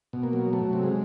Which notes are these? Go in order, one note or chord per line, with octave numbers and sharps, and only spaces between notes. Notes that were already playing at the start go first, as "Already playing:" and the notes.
B2
A#3
F#3
F#3 A3
C3
G#3